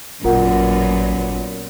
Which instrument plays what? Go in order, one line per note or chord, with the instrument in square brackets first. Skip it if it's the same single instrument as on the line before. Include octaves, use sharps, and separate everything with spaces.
[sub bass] A1 [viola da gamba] F#2 A#2 B3 [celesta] F4 A#4 F#5